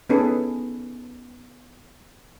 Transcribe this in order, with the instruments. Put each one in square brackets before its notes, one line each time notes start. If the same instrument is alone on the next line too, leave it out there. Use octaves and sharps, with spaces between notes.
[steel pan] B3 C#4 D#4 G#4 A4 B4